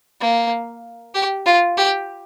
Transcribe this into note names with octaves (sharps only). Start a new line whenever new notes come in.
A#3
G4
F4
G4